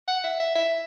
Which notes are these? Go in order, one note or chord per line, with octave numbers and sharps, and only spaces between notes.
F#5
E5
E5
E5